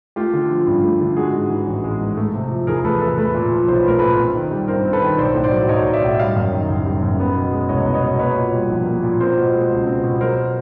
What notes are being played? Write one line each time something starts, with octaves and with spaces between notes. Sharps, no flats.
A3 F4 G4
D3
F3
G2
A3
D3
G#3 F#4 G#4
G#2
E3
A1
G#3
G#2
A3
C3
F3
E2 G#4 A#4
A3 A4 B4
C3 A4 B4
A3 A4 B4
A#2
F3
B1 C5
B4
A3 A#4
A#2 A4 B4
C4
D#3
G3
G2 A#4 C5
C4
A4 B4
D#3
B1 C5 D5
A2
C5 D5
F#3
B1 C#5 D#5
B1
D5 E5
A2
G3 D#5 F5
F#2
D#3
F#1
G3
F#2
B3
B2
G#3
C2 C#5 D#5
B3
C#5 D#5
B2
A#3 B4 C#5
A#2
G3
A#1
A#3
A#2
C4 A#4 C5
B2
G#3
C#2
C4
B2
F#3 A#4 C5